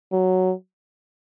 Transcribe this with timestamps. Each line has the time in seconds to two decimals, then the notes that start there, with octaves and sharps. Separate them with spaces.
0.12 F#3